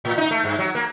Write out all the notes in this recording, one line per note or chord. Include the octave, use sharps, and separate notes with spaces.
A2
D#4
A3
G2
F#3
A#3